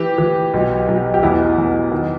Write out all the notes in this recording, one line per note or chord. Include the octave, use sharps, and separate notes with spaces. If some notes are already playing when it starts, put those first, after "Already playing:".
Already playing: E3 G4
E3
B1
B1
G4
E2 E4
E2
D#3